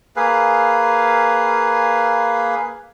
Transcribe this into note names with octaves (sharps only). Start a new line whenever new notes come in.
A#3 G#4 B4 F5